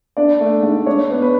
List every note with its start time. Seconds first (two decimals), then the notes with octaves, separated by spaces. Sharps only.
0.17 D4 D5
0.41 A3
0.63 G#2
0.86 D4 C#5
1.10 B3
1.22 B4